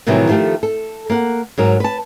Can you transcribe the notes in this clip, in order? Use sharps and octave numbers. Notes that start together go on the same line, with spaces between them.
A2 C3 D#3 E3 F#3 G3
D#3 F3 A3 G4 A4
A4
A#3 F#5
G#2 F#3 A#4
B4 A5